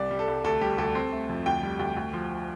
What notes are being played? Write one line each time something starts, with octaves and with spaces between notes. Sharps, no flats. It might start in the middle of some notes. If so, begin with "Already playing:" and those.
Already playing: C2 D5
G3
A4
C2
D2 A4
G3 G4
D2 A4
C4
A3
F2
D2 G5
G3
D2
D2
F3